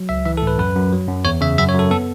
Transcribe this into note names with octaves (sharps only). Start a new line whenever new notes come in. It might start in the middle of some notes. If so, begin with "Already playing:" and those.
Already playing: F#3
C#2 E5
E3 E5
A4
A2 B4
F#2 B4
F#2
F#3
F#2
E2 C#5
C#3 E5
F#2 E5
C#5
F#2 A4
B3 A4